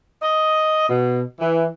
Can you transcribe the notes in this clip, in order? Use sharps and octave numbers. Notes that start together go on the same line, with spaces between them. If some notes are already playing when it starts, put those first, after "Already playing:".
D#5
B2
E3